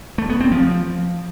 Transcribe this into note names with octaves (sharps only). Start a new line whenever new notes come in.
A3
B3
C4
F3